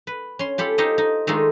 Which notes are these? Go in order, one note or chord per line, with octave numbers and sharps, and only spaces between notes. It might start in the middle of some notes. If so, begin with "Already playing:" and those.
B4
C#4 C6
F4 G4 A4 B5
D#4 F4 G4 A4 C5 D#5
D#4
D#3 G#3 A3 D4 D#4 F4